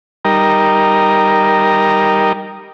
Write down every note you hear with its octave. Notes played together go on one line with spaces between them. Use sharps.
G3 D#4 A#4